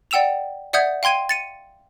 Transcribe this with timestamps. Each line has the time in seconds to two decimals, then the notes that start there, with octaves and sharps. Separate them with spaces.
0.11 D5 F#5 G5 E6 E7 F7
0.73 D5 E5 F#5 D#6 G6 G#6
1.03 F5 G5 C6 G#6 D#7
1.29 A6 C#7 D#7